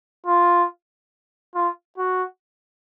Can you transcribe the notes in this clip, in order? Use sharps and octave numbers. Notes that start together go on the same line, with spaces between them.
F4
F4
F#4